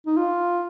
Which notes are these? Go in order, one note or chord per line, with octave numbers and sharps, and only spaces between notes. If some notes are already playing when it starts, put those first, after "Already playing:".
D#4
F4